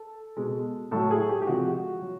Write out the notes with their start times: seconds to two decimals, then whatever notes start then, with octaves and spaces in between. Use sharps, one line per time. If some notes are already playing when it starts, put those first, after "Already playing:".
Already playing: A4
0.37 B2 G#3
0.91 A2 F#3 A4
1.11 G#4
1.29 G4
1.42 G4
1.47 C3 F3 G#3 F#4
2.02 F#3